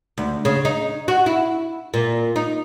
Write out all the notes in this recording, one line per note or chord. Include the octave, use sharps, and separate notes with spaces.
D2
C#3
D#4
F#4
E4
A#2
D#4